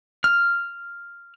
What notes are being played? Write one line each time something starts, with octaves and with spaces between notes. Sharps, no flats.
F6